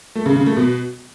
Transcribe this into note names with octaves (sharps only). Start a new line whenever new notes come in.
A3
C#3
C#3
A3
B2